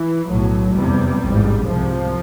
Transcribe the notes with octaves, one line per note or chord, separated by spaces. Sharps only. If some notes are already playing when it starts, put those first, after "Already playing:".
Already playing: E3
B1 A2 F#3
F1 E2 C3 G3
A1 G#2
C2 C3 F3